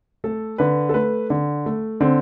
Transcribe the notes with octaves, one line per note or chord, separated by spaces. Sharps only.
A3 A4
D3 B4
A4
A3 B4
D3
A3
D3 C4